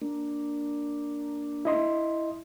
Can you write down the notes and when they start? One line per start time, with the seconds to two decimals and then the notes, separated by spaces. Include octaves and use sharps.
0.02 A#3 D4
1.65 E4 D#5 C6